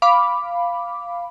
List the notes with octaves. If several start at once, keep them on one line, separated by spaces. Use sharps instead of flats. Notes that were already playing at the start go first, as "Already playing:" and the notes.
F5 B5 D6